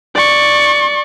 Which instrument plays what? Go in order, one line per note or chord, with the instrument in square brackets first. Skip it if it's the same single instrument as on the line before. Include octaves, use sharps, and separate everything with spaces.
[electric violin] D5 C#6